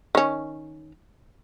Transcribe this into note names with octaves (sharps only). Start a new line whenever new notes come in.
D#3 C#4